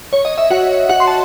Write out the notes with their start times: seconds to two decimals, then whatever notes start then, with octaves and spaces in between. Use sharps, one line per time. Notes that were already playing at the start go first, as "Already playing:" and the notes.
0.13 C#5
0.25 D#5
0.38 E5
0.50 F#4 F#5
0.89 F#4 F#5
1.00 C6
1.07 A5